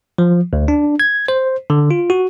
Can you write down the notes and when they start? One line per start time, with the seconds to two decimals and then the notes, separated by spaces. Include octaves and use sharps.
0.18 F3
0.53 D2
0.68 D4
1.00 G#6
1.28 C5
1.70 D3
1.91 F4
2.10 F#4